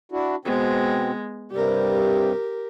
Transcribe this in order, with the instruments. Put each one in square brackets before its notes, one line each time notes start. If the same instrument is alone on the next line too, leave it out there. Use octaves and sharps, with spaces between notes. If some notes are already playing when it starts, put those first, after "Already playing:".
[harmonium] D4 E4 F#4
[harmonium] B2 C4 [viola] G#3 B3
[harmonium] G2 C3 G3 [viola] G4 A#4